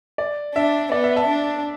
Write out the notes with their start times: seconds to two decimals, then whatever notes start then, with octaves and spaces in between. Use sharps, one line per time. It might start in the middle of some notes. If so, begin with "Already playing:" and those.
0.18 D5
0.55 D4 E5
0.92 B3 D5
1.04 E5
1.16 E5 A5
1.28 D4